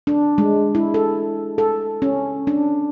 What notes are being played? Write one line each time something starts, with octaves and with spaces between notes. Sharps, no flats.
D4
G#3
E4
A4
A4
C#4
D4